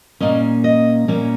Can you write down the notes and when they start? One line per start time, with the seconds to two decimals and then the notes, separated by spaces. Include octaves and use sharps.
0.20 A#2 A#3 C#4 D#5
0.64 D#5
1.08 A#2 A#3 C#4